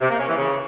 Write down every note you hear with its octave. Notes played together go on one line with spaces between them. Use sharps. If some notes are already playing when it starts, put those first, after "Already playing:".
C3
A#3
C#4
E3
C#3